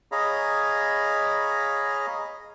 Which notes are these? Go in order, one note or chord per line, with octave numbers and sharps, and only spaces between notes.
G#4 C#5 D#5 F5 A#5 B5